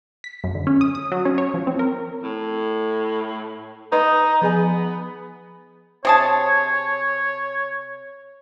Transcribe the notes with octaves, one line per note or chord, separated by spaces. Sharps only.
B6
F#2
D3
C#4
D#6
D#6
F#3
C#4
C#5
F3
C4
A#4
A2
D#4 B4 D#5 B5
F3 B3 G#4 G#5
C3 G#4 C#5 A5